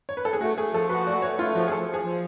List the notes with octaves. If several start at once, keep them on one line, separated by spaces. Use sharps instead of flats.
C#5
B4
A4
G#4
A3 F#4
A3 G#4
F3 A4
F#4 B4
A3 D5
A3 C#5
A3 F4
F3 F#4
G#4
F3 A4
F3
G#4
F3